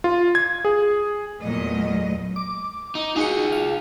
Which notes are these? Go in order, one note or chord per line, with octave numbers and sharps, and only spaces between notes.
F4
G#6
G#4
E2 A#2 F#3 A3 D#5
D6
D#4
D#4 F4 F#4 G#4 C#7
F5